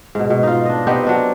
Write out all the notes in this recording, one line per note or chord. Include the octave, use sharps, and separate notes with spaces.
G#2 B2
B2
D#4 F4
D4 D#5
B3 C4 D#4 G4
F#3 D4